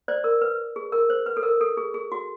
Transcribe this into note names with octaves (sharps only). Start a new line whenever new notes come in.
C5 D5
A#4
B4
G#4
A#4
C5
B4
A4
A#4
A4
G#4
G#4
F#4